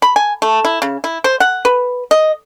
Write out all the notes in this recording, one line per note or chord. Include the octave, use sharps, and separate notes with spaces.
B5
G#5
A3
E4
C#3
E4
C5
F#5
B4
D#5